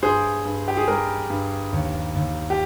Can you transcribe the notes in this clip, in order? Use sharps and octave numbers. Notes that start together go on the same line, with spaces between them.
G2 G#4 C5
G2
G4
G#4
G3 G4 A#4
G2
D#2
D#2
G4